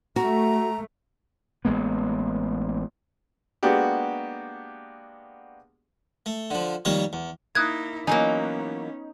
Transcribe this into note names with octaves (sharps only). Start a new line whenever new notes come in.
A3 F#4 A#5
A1 G#3 A#3 B3
G#3 A#3 B3 D4 F#4 G4
A3
D3 F3
F2 D#3 G3 A#3 C#5
E2
A#3 D#4 E4 D#6 F#6 G#6
E3 F#3 A#3 B3 C#4 D#4 G#5